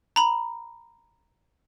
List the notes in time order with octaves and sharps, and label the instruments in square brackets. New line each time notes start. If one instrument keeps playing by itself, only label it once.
[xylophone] A#5 B5